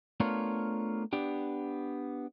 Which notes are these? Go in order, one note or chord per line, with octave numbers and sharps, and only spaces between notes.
A3 B3 D4 F4 A#4 C#5
B3 D4 G4